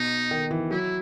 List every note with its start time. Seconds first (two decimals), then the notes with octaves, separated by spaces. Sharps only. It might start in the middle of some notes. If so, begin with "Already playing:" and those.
Already playing: B2 D#4
0.31 D#3
0.51 E3
0.71 F#3 E4